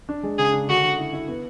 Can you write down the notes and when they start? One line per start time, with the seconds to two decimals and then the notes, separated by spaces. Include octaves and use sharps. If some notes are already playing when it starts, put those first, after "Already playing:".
0.09 D4
0.23 G#3
0.38 C#3 G#4
0.53 D4
0.68 D3 F#4
0.83 D3
0.98 E4
1.13 E4
1.28 B3